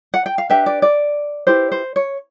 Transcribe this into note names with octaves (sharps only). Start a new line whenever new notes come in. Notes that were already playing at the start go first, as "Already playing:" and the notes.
F#5
G5
F5
D4 G4 B4 E5
D5
D5
E4 G4 B4 C5
C5
C#5